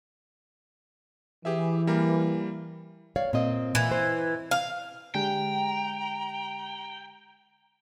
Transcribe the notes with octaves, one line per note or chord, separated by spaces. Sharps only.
E3 G4 G#4 E5
G3 A#3 A#4
C#5 D5 F5
A#2 C4 D#5
A#2 E3
C5
F5
D3 G#3 G4 G5 A#5